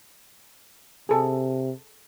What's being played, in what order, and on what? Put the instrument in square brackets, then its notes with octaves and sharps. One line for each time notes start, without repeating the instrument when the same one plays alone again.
[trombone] C3 [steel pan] G#4 A4